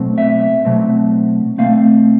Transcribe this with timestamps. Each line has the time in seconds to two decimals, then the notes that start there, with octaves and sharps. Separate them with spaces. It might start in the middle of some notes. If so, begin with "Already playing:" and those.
Already playing: B2 F#3 A3 C4
0.18 E5
0.65 B2 F#3 A3 C4
1.58 B2 F#3 A3 C4 F5